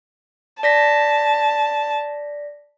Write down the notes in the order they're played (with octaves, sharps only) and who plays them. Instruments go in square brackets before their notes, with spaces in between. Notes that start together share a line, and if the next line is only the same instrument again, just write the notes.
[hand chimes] D5 A#6 B6 [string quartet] A5